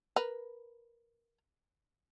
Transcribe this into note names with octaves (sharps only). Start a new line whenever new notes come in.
A#4 B4